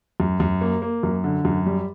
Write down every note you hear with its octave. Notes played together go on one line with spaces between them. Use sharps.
F#2
F#2
A#3
A#3
F#2
D3
F#2
G3